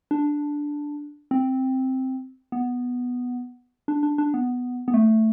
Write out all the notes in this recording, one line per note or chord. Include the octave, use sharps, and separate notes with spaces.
D4
C4
B3
D4
D4
D4
B3
B3
A3